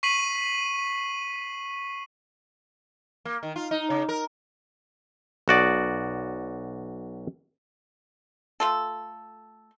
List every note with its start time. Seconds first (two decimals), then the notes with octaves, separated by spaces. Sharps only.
0.03 C#6 B6 C7 D#7 F#7
3.25 A#3
3.43 D#3
3.56 F4
3.71 D#4
3.90 C#3
4.09 A#4
5.48 B1 F#4 D5 D#5
8.60 A3 F4 A4